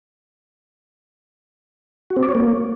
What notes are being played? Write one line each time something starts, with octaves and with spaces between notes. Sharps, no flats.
F#4
C4
D5
C#5
A#3